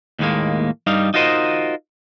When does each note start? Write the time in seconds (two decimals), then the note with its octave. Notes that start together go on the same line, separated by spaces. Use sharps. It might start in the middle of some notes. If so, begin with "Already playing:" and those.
0.19 D#2 A2 G#3 A#3
0.87 G2 G3 D#4 F5
1.14 D#4 F4 F#4 A#4 C5 D#5